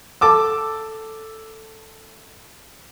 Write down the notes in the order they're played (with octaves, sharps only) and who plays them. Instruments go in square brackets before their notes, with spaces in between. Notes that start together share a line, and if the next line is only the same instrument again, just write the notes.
[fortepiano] A4 A5 D6 E6